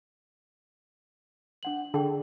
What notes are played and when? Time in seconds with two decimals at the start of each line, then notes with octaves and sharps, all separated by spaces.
1.63 D4 F#5 F#7
1.94 D3 G#4 G5